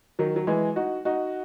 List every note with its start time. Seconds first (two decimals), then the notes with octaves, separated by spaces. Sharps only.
0.19 D#3 F#3
0.36 F#3
0.47 E3 G#3
0.76 D#4 F#4
1.05 D#4 F#4